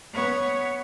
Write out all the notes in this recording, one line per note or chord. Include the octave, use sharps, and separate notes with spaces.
B3 C#5